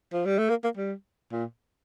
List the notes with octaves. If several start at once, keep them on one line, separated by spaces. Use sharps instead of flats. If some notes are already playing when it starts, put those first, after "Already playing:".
F3
G3
A3
A#3
A#3
G3
A#2